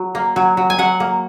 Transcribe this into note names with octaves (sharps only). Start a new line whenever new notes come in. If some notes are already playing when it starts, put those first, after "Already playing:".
Already playing: F#3
A#3
F#3
F#3
G#5
F#3 F#5
A#3